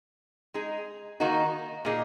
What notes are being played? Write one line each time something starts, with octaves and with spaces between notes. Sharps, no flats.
G#3 D#4 G#4
D#3 A#3 D#4 F#4
A#2 A#3 D#4 G#4